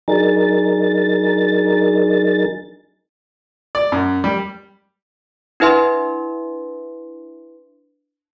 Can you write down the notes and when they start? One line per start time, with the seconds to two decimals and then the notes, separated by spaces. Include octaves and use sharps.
0.08 F#3 D4 D#4 G#4 A#4 A6
3.75 D5
3.92 F#2
4.24 G3
5.60 D4 E4 B4 E5 C6